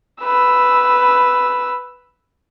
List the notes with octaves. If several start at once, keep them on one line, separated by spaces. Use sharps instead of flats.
B4 E6